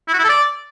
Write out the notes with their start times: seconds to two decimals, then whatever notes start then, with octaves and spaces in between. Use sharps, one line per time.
0.08 E4
0.14 F#4
0.19 E4
0.24 A4
0.29 D5